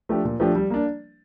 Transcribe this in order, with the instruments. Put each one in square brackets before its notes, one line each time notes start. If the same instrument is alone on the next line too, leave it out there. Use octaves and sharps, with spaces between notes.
[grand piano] F3 A3 D4 G4
A#2
F3 A3 D4 G4
G3
A#3 D4